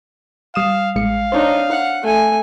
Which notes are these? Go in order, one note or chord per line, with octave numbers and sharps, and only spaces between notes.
G3 F5 D#6 E7
A1 G#3 F5 C#7
D4 D#4 C5 C#5
F#5
A3 G#5